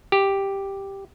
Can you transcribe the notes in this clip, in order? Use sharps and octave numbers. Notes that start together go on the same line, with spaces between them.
G4